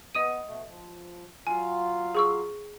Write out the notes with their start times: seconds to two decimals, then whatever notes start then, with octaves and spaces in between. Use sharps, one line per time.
0.15 B3 D#5 D#6 D#7
0.48 B2 A3
0.68 F3
1.47 F#3 F4 F5 G#5
2.15 G#4 C#6 E6